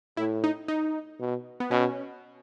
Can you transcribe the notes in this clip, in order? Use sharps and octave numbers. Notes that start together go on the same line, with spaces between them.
A2 E4
D#4
D#4
B2
B3
B2 C#4